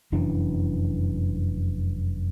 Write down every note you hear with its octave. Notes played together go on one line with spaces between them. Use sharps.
F1 F#2 E3 D4